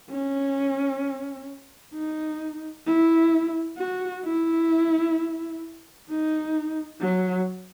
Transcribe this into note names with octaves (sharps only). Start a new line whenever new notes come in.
C#4
D#4
E4
F#4
E4
D#4
F#3